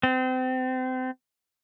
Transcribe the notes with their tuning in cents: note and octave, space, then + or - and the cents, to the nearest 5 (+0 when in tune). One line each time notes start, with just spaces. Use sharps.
C4 -30